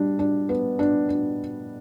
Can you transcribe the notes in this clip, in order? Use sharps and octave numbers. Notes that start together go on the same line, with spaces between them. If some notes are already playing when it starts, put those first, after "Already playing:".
Already playing: G3 D4
D4
B3
D4
D4